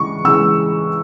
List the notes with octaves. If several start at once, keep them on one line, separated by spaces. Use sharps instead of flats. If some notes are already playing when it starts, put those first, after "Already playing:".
Already playing: C#3 E3 G#3 C#6
C#3 E3 G#3 E6